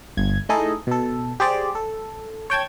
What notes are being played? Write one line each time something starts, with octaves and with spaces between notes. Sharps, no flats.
G1 G#6
A3 D#4 E4 G#4 A4 D#5
B2 A4
G4 G#4 C5 D5
A4
C#5 G5 A5 G#6